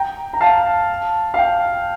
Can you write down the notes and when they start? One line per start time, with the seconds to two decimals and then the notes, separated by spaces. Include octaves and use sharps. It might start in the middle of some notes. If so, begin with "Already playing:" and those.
Already playing: G5 A#5
0.33 A#5
0.41 F5 A5
1.34 F5
1.39 G5